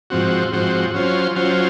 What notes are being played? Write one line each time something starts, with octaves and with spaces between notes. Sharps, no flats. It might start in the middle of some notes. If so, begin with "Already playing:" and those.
G#2 F3 C4 F#4
G#2 F3 C4 F#4
F#3 C#4 F4 C5
F#3 C#4 F4 C5